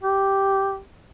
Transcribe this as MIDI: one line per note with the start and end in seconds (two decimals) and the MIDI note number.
0.03 0.77 67